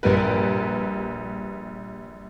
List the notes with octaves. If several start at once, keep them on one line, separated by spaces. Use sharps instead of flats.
A#1 G3 A#4 B4